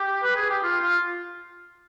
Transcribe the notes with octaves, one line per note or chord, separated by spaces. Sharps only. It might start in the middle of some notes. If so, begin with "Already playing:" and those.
Already playing: G4
B4
G#4
G4
F4
F4